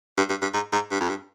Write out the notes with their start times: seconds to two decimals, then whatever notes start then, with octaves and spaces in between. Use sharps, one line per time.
0.17 G2
0.29 G2
0.42 G2
0.54 G#2
0.73 G#2
0.91 G2
1.01 F2
1.09 G2